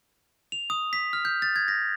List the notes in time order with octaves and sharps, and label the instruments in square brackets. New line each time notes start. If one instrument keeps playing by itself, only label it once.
[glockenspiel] F7
D#6
B6
F6
G6
A6
G#6
A#6